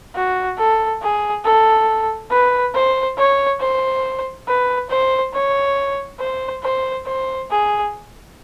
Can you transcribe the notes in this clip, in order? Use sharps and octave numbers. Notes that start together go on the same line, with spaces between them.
F#4
A4
G#4
A4
B4
C5
C#5
C5
B4
C5
C#5
C5
C5
C5
G#4